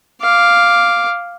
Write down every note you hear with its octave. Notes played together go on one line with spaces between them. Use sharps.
F5 D6